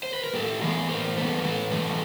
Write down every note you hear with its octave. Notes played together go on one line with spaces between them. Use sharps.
C5
B4
A#4
A2 G4 A4
E3 G#3 B3 G#4 A#4
A2 A#4 C5
E3 G#3 B3 A4 B4
A#4
A2 A4 B4
E3 G#3 A4 B4